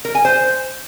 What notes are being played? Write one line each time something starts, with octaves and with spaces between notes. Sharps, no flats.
A#4
G#5
C5